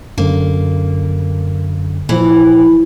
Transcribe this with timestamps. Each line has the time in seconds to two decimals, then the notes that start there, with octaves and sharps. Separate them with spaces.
0.18 F#2 D3 A#3
2.09 A#2 E3 F3